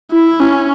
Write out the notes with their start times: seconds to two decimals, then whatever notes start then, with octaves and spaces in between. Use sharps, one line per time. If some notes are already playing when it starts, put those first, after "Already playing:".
0.11 E4
0.40 C#4